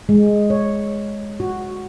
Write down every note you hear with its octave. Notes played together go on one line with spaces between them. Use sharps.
G#3
C#5
F#4